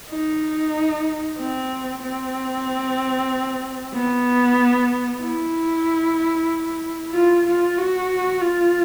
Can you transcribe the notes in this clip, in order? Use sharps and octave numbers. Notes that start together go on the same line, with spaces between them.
D#4
C4
C4
B3
E4
F4
F4
F#4
F4